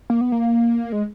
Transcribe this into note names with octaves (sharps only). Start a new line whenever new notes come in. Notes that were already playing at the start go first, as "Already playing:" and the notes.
A#3
B3
A#3
G#3